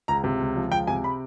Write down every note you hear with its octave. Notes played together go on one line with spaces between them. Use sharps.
C#2 A#5
C3
C#2
F3
C#2 G5
C3 G#5
B5